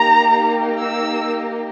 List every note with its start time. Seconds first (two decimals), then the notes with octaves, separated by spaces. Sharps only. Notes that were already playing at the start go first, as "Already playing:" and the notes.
Already playing: A#3 D#4 G4 A#5
0.82 E6